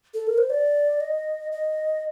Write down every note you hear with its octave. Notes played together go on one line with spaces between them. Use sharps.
A4
A#4
C5
D5
D#5
D#5